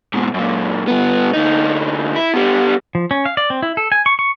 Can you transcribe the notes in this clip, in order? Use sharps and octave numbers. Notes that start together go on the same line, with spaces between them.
G#2 B2
F#2 A#2
G2 B3
D2 D#4
E4
G3 B3
F3
C#4
F5
D5
C4
E4
A4
G#5
C#6
C#6